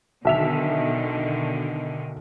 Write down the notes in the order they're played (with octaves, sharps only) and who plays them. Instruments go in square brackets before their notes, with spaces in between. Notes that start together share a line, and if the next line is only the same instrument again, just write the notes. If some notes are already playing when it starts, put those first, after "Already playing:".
[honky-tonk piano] B1 E5 F7 [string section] B2 D3 D#3